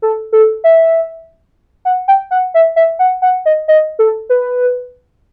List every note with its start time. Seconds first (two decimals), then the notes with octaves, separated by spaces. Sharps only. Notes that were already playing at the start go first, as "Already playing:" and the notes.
0.02 A4
0.32 A4
0.64 E5
1.85 F#5
2.08 G5
2.31 F#5
2.54 E5
2.76 E5
2.99 F#5
3.22 F#5
3.46 D#5
3.68 D#5
3.99 A4
4.29 B4